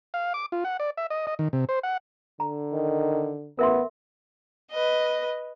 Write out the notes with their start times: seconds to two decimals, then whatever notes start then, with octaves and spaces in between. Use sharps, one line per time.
0.14 F5
0.34 D6
0.52 F4
0.65 F#5
0.80 D5
0.97 E5
1.10 D#5
1.27 D#5
1.39 D#3
1.53 C3
1.69 C5
1.83 F#5
2.40 D3 A#5
2.73 D#3
3.59 A1 B3 A#4 E5 C6
4.71 B4 D#5